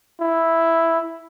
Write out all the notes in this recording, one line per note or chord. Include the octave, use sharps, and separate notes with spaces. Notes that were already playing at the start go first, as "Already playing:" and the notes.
E4